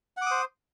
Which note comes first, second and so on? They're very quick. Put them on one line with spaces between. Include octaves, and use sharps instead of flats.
F#5 D6 D#6 C5